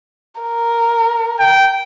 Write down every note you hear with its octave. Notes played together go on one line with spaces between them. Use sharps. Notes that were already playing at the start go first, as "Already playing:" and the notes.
A#4
G5